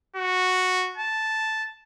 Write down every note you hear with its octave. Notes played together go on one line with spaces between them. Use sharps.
F#4
A5